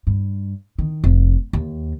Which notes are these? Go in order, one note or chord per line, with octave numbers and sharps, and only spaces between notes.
G2
D#3
F1
D#2